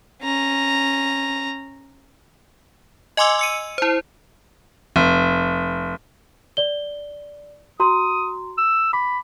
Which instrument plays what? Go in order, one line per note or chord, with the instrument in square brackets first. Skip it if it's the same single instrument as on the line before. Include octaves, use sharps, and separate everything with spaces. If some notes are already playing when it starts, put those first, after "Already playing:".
[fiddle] C#4 A#5
[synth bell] D#5 G#5 C6 D6 E6
E6 C#7 D#7
E4 C5
[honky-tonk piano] F1
[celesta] D5 G7
[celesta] F#4 A#5 C6 [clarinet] D#6
[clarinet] E6
[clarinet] B5 [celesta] D6